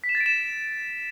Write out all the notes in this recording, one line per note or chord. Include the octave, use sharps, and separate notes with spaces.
B6
E7
A6
D7
E7